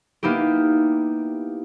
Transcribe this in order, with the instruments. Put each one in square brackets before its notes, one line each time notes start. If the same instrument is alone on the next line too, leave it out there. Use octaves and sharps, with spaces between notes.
[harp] A#3 B3 D#4 E4 G4